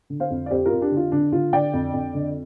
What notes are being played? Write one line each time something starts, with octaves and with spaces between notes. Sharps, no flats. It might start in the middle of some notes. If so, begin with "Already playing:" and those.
D3
C5 F5
F2
D5
F2 G4 C5
F4 A#4
F2
D4 G4
D3
F4
D3 D4
D3 F4
D3 D5 G5
F2
F2
D3